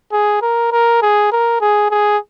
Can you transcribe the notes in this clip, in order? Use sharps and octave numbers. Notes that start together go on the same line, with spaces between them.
G#4
A#4
A#4
G#4
A#4
G#4
G#4